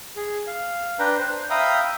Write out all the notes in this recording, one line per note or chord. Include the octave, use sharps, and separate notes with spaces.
G#4
F5
D4 B4 G5 A#5
C5
E5 F5 G5 A#5 B5 D#6